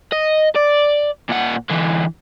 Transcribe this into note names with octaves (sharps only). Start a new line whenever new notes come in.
D#5
D5
A#2 F#5
D3 E3